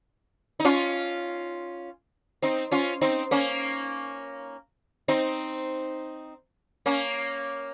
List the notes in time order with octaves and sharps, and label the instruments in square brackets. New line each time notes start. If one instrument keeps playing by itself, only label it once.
[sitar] D#4
C#4 F4
C4 D#4
C#4 F4
C4 D#4
A#3 C#4
C4 D#4
A#3 C#4